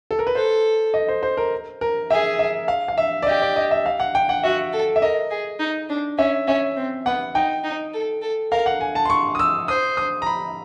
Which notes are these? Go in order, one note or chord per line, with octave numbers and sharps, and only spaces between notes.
A4
A#4
B4
A4 C5
D#5
C5
C5
A#4
A#4
G#4 E5
E5
F5
F5
E5
D5
G4 D#5
D5
D#5
E5
F5
F#5
G5
F#5
F#4 E5
A4
E5
A#4 D#5
G#4
D#4
D4
C#4 E5
C#4 E5
C4
B3 F#5
D#4 G5
D#4
A4
A4
A#4 F5
F#5
G#5
A5
C6
C#6
D#6
E6
C5 D#6
D#6
A#5
B5